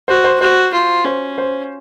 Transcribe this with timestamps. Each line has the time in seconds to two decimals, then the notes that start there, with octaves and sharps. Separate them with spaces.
0.08 F#4 C5
0.24 C5
0.40 F#4 C5
0.73 F4
1.05 C#4 C5
1.38 C5